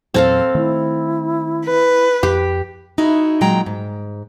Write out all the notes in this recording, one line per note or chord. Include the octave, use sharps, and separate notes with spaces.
E2 A#2 F#3 C4 A4 F5
D#3 A3 E4
B4
F2 G4
D#4 E4 F#4 G#4
A#2 F#3 G#3 G5 A#5
G#2